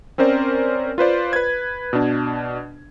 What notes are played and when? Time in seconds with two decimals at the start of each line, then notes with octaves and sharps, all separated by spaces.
0.18 C4 C#4 A#4 C5 D5
0.98 F4 B4 C5 D5
1.33 B4 G#6
1.93 B2 D4